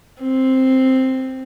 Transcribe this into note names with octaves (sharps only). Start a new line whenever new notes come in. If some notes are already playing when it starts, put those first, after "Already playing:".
C4